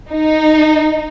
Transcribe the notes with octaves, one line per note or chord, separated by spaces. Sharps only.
D#4